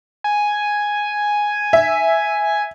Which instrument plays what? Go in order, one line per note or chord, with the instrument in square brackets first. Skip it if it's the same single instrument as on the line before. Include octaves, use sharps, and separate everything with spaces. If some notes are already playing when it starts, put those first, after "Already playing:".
[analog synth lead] G#5
[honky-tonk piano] E5